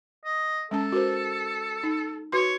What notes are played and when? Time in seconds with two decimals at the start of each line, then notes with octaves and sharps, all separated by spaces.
0.24 D#5
0.71 G#3 C#4 A4 A5
0.92 F#4 A#4 C5
1.83 D#4
2.32 F#4 B4 C#5 C6